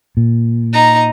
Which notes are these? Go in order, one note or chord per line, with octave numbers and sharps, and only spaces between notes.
A#2
D#4 A#5